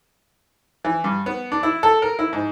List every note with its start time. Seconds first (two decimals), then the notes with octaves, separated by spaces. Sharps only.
0.84 E3
1.04 G2
1.26 B3
1.52 D4
1.63 E4
1.83 A4
2.02 A#4
2.19 E4
2.33 G#2